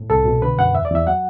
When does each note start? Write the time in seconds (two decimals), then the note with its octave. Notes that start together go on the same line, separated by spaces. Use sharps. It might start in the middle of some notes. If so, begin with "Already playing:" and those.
Already playing: A2
0.10 C2 A4
0.25 B2
0.42 D3 B4
0.58 F#2 F#5
0.74 E2 E5
0.85 D5
0.90 E2 E5
1.07 F#3 F#5